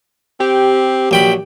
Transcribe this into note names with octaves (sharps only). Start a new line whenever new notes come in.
C4 G4
A#1 F#3 G5 B5